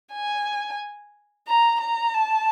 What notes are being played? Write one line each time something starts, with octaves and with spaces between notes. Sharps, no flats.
G#5
A#5
A#5
A5